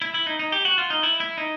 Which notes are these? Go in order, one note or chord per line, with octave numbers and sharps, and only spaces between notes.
E4
E4
D#4
D#4
G4
F#4
F4
D#4
E4
E4
D#4